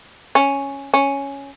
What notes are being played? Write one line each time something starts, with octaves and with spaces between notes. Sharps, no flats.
C#4
C#4